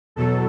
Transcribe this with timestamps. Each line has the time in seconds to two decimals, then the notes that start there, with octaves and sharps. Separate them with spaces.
0.16 E2 B2 F#3 A4